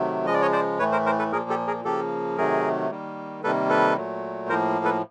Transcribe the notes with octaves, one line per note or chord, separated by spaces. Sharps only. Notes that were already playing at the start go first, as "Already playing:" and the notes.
Already playing: C3 D#3 F#3 A3
C#3 F3 G#3 D#5
D5
C#5 D#5
C5 D5
A2 E3 A3 B4 C#5
A#4 C5
A#4 C5
A4 B4
A#2 F3 A#3 G#4 A#4
G4 A4
G#4 A#4
C#3 F3 A#3 G4 A4
C3 D#3 F#3 A3 G#4 A#4
D#3 G3 A#3
C3 D#3 G3 A#3 A4 B4
A4 B4
A#2 F#3 A3
A2 F3 A#3 A#4 C5
A4 B4